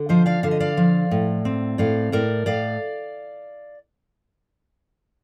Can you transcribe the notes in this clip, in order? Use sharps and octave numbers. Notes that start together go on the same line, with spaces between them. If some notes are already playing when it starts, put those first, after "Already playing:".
Already playing: D3
F3 C5 D#5
D5 F5
D3 F5
D#5
D5 F5
F3
A2
C4
A2 D5 F5
A2 A#4 D5
A2 D5 F5